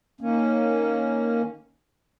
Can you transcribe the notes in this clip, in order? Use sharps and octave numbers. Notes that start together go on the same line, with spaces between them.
D#3 A#3 C#4